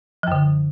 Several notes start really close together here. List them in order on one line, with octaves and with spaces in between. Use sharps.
F3 F#2 D3